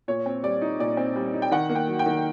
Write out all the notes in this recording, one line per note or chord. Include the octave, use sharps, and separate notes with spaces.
A#2 C#5
C4
G3 D5
D#4
A#2 D5
C4
G3
D#4
G5
D#3 F#5
A#3
G5
F#3
G5
D#3